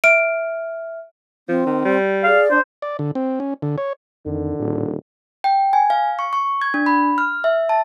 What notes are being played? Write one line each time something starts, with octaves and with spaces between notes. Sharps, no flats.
E5 F6 D7
F3 C4
D#3
G3
G#4 D5 F5
D4 C5
D5
D3
C4
C#4
D3
C#5
F2 D3 D#3
D#1 A2
G5
G#5
F5
C#6
C#6
G#6
D4
B5
F6
E5
A5